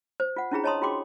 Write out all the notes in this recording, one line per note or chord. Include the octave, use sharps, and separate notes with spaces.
C5
F4 F#5
C#4 D4 E4 F4 G#4 A#5
C#5 D#5 A5 A#5 C6 D#6
F4 F#4 G#4 G5 C6 D6